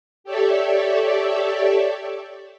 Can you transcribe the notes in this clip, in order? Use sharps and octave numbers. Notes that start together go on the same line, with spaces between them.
G4 A4 C#5 D5 E5